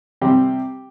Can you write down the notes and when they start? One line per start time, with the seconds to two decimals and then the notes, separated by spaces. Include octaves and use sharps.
0.22 C3 G3 C4 G4